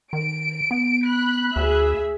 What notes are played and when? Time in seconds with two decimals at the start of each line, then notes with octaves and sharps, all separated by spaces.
0.13 D#3 D7
0.71 B3
1.05 B5 F#6
1.56 D2 G#4 E5